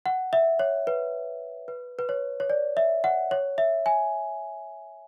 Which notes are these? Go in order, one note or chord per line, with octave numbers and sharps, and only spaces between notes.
F#5
E5
C#5
B4
B4
B4
C#5
C#5
D5
E5
F#5
C#5
E5
G#5